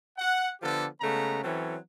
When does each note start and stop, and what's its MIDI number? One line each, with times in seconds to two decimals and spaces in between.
0.17 0.49 78
0.62 0.86 50
0.62 0.86 53
0.62 0.86 59
0.62 0.86 67
0.62 0.86 69
1.01 1.40 49
1.01 1.40 56
1.01 1.40 57
1.01 1.40 59
1.01 1.40 82
1.43 1.75 52
1.43 1.75 54
1.43 1.75 60
1.43 1.75 61
1.43 1.75 69